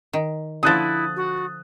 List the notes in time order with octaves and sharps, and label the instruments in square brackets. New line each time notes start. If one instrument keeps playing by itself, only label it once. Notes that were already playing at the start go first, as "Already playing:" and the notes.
[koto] D#3
[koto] D3 F3 [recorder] E4 [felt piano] D#6 F#6 A6
[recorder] F#4